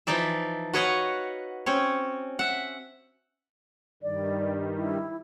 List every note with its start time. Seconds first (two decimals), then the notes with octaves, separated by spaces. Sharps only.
0.07 E3 F3 D#4 D5 E5
0.73 F#4 B4 C#5 D#5 F5 F#5
1.66 C4 C#4 C#5
2.39 E5 F#5
4.03 G2 D#3 G3 D5
4.77 E4